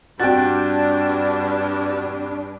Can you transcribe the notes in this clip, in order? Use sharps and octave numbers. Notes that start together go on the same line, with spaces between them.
G2 C4 D4 F#4 D5 G5 A6